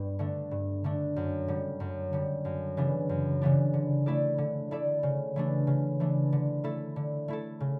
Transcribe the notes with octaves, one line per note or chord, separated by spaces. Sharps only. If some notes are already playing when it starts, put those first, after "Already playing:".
Already playing: G2 G3 B3 B4
D3 A3 D4
G2
D3 A3 D4
F#2
D3 G3
F#2
D3 G3
F#2
C#3 E3 B3 D4
F#2
C#3 E3 B3 D4
D3
A3 E4 A4 D5
D3
A3 E4 A4 D5
C#3
E3 A3 D4
C#3
E3 A3 D4
D3
A3 E4 A4
D3
A3 E4 A4
C#3